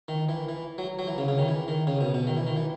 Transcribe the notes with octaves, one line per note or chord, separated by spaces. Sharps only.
D#3
E3
E3
F#3
F#3
E3
C#3
C#3
D#3
E3
D#3
C#3
B2
B2
D#3
E3
D#3
E3